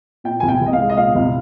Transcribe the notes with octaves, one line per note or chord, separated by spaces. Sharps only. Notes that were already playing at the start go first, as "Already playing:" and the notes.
A#2 G5
C2 G#5
G5
C2
D#5
F5
G#3
D#5
A#2 F5
C2